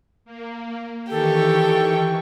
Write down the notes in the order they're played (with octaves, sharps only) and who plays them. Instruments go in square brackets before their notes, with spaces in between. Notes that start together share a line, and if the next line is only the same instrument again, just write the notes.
[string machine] A#3
[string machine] D#3 E3 C#6 [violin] G4 G5 [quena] A4